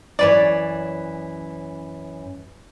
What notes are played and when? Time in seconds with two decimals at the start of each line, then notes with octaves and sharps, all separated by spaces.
0.19 F#2 E3 B4 C#5 D5